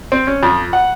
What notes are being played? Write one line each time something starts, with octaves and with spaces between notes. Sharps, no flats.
C4
C#4
F2
F#5